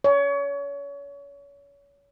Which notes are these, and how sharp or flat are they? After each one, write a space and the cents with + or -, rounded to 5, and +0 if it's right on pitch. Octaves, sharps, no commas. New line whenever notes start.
C#5 +30